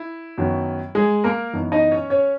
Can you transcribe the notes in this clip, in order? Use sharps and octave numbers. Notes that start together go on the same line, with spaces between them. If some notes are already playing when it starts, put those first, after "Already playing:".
Already playing: E4
F#2 D#3 F#3 B3
G#3 G#4
A#3 A#4
F#2 E3 B3 D#4
D#4 D#5
C#4 C#5
C#4 C#5